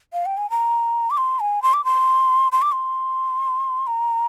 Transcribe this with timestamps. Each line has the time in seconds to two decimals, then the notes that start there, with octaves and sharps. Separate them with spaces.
0.13 F5
0.26 G5
0.37 G#5
0.50 A#5
1.10 D6
1.17 C6
1.40 G#5
1.62 C6
1.73 D6
1.84 C6
2.52 C6
2.62 D6
2.72 C6
3.87 A#5